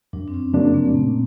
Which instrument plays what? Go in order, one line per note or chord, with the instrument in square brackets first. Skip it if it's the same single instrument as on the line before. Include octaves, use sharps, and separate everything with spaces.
[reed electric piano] F#2 [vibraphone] D4
[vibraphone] C4
C#4
[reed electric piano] C#3 F#3 A#3 D4 [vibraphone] C4
[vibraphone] A3
A3
[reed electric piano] A#2 [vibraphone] A#3